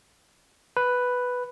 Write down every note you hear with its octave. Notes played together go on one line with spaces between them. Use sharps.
B4